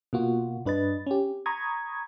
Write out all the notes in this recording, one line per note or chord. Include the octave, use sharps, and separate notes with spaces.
B2 A#3 F4 F#4
G2 D4 B4 D#5 A6
C#4 G4
A#5 B5 C#6 D#6 G#6